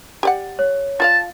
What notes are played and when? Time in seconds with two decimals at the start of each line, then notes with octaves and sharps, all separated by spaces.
0.23 G4 D5 F#5
0.59 C#5
1.00 F4 D5 F5 A5